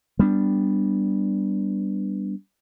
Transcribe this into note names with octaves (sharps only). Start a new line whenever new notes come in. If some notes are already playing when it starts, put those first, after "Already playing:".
G3 B3 D4